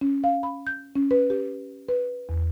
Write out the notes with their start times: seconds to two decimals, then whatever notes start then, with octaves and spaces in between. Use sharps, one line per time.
0.01 C#4
0.24 F5
0.43 B5
0.67 G6
0.96 C#4
1.11 B4
1.30 G4
1.89 B4
2.29 E2